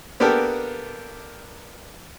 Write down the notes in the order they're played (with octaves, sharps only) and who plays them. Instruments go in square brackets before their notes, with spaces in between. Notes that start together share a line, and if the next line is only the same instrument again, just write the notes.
[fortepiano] A#3 B3 D4 G4 A4 A#4